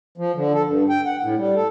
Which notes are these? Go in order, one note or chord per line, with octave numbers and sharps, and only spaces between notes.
F3
D3
A4
G2
G5
F#5
A2
G3
A4